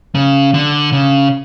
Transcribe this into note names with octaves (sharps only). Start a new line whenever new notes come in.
C#3
D3
C#3